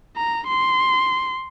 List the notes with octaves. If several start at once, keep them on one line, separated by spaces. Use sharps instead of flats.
A#5
C6